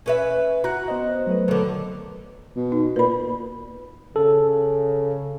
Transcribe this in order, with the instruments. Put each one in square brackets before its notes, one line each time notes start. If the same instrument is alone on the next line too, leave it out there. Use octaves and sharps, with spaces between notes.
[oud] C#4 B4 E5
[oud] F#4 [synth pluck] A#5 F#6
[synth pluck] B3 C5 D#5
F#3 A3 B4
[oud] D3 D#3 [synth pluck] A4 B4 C#5
[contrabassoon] B2
[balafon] D#4
[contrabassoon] A#2 [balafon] B4 B5
[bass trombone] C#3 [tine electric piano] A4